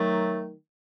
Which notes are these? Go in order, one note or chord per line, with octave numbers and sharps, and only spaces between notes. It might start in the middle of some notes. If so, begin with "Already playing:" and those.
Already playing: D#3 F#3 A3